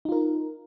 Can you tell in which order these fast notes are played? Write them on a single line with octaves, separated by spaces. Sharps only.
D#4 F4 A#4